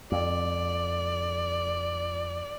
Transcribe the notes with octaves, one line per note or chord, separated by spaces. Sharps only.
F2 D5